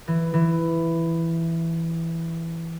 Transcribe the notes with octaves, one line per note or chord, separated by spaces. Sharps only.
E3
E3